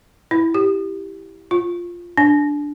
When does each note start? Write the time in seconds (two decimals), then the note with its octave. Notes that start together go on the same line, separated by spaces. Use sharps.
0.31 E4
0.54 G4
1.51 F4
2.17 D4